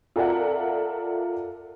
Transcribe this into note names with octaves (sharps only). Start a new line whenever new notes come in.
F4 A4 A#4 D5 E5 F#5